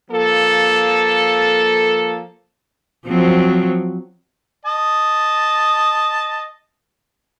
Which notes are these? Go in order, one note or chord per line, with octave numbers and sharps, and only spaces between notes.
F3 A#3 A4
F3 F#3 C4
D#5 A5